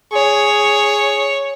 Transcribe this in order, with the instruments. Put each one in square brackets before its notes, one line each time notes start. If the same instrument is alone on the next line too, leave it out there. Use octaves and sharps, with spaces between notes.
[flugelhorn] G#4 [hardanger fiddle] C#5